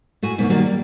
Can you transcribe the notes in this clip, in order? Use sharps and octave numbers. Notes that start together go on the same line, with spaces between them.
A2 F#4 G#5
G#2 B2 F#3 A#3
D#3 F#3 G3 A#3 F#4
G3